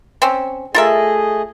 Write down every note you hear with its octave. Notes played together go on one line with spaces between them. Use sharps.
C4 C#4
A3 F4 G#4 A#4 D#5 E5